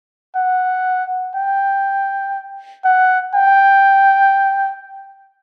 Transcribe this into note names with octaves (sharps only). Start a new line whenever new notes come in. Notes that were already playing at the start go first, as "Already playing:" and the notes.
F#5
G5
F#5
G5